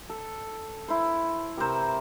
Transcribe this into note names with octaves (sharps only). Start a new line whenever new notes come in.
A4
E4 C5
C3 A#4 C5